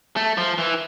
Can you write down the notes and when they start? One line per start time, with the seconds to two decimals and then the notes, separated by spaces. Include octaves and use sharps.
0.16 A3
0.38 F3
0.58 E3